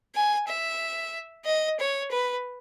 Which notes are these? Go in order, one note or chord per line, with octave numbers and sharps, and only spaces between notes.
G#5
E5
D#5
C#5
B4